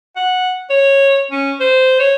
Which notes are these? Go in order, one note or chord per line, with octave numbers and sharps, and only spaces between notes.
F#5
C#5
C#4
C5
C#5